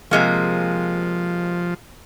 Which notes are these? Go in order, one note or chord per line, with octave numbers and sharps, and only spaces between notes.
C3 F3 G#3 A#3